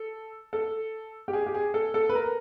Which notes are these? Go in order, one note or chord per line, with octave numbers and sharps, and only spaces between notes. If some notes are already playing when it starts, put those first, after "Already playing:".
Already playing: A4
A4
G4
G#4
G4
G#4
A4
A4
B4
A#4